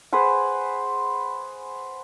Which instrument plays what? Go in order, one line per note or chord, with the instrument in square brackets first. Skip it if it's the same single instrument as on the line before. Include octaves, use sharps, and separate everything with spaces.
[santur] G#4 B4 C5 F#5